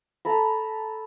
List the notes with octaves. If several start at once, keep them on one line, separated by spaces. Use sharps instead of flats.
A4 A#5 B5